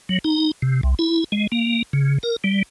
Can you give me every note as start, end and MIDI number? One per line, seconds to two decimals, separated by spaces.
0.09 0.19 54
0.24 0.51 63
0.62 0.81 48
0.83 0.94 36
0.99 1.24 64
1.32 1.47 56
1.52 1.83 58
1.93 2.18 49
2.23 2.36 70
2.44 2.63 55